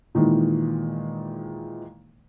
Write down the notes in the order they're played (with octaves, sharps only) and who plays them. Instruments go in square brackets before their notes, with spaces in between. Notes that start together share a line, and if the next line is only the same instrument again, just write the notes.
[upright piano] A#2 D#3 E3 G#3